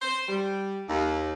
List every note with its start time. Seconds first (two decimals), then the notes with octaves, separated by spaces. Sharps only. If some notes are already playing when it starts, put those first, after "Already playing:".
0.02 C5
0.28 G3
0.89 D#2